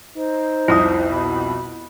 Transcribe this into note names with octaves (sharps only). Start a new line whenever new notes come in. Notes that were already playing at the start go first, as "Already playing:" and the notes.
D#4 C5
C2 F2 E4 D#6
B2 B5